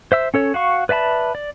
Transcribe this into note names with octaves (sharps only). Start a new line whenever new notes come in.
C5 E5 E6
C#4 A4 C#5
F#4 F5 C#6
B4 D5 E5 A5 B5
D5